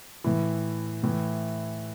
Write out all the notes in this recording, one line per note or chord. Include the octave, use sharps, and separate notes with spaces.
A2 E3
A2 E3